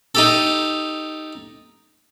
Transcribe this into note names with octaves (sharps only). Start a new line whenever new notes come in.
D#4 G4 A4